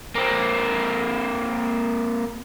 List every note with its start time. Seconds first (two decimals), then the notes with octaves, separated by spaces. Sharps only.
0.15 A#3 C4